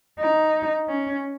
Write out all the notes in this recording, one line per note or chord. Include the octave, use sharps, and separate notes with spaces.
D#4
C#4